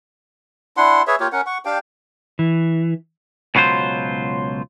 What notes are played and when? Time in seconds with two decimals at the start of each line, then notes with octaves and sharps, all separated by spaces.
0.77 D4 E4 F#5 C6
1.07 G#4 B4 C#5 E5
1.20 A#3 F4 G4 C#5
1.32 C#4 A#4 F#5
1.46 F#5 C#6
1.65 D4 G4 F5 G5
2.39 E3
3.55 C#2 B2 F#3 F4 C5